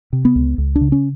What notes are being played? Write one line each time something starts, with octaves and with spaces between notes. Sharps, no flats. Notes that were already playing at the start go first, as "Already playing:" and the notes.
C3
B3
C#2
C#2
D4
C#3
C#4